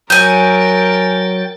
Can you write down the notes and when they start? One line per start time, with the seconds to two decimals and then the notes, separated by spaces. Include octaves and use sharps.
0.10 F#3 A#4 G5 G#5 G6 A6